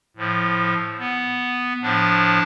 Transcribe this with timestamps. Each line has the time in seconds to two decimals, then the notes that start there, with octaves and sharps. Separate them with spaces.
0.16 A2 F3
0.99 B3
1.82 A2 F3 D4